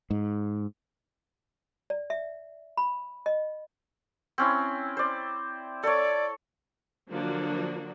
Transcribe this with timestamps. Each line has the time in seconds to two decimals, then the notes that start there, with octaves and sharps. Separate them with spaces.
0.10 G#2
1.90 D5
2.10 E5
2.77 B5
3.26 D#5
4.38 C4 C#4 E4
4.97 C5 D5
5.83 A4 C#5 D5
7.09 D3 F3 F#3 A#3 D4 F#4